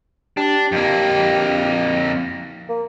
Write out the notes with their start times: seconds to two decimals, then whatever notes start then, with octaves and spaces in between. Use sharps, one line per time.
0.37 D4 G4
0.72 F2 A#3
2.69 A#3